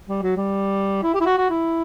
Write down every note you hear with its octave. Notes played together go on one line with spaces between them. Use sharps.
G3
F#3
G3
E4
G4
E4
F#4
F#4
E4